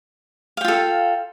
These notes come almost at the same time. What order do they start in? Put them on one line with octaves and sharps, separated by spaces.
F5 G5 F4 A4